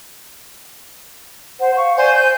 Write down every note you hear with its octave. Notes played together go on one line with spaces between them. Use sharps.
C5 F#5
F5 C#6
C5 D5 G#5
C5 G6